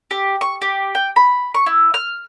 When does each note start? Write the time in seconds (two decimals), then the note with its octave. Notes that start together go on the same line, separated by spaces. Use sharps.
0.11 G4
0.41 C#6
0.62 G4
0.95 G5
1.16 B5
1.54 C#6
1.66 E4
1.94 F6